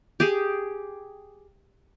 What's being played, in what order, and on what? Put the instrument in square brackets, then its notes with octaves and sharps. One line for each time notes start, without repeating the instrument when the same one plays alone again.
[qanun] G4 G#4